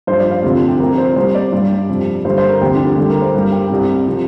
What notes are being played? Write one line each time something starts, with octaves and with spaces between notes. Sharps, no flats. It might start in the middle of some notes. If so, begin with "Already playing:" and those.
G2 F3 C5
D5
F5
D2 C3 F3 F4
D4
G4
C2 C3 F3 A#4
C5
C2 C3 G3 C5
D5
G2 G3
F2 C3 G3
G2 D3 G3 C5
C5
A#4
D2 C3 F3 G4
D4
F4
D2 D3 G3 G4
A#4
C5
G2 G3 A#4
G4
C2 C3 G3
C3 F3